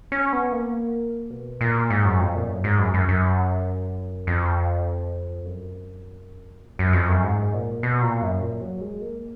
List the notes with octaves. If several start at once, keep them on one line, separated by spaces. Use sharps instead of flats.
C#4
B3
A#3
B2
A#2
G#2
F#2
F2
A#2
F#2
G#2
F#2
F#2
F#2
F2
F#2
A#2
F#2
F2
F#2
G#2
A#2
B2
A#2
F#2
A#2
F#3
G#3
A#3